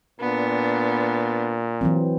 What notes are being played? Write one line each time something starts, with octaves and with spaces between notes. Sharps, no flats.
A#2 B3 D4
E3 F#3 C4